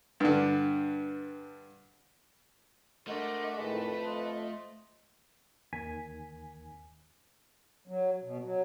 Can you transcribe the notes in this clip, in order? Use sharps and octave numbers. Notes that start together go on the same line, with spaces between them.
G2 D3
A3 D4 F#4 A#4 C5 D#5
A2 D#3 G#3 B4 A5
F2
F4 D#5
D#2 D#3 G#5 B6
F#3
B2
F#3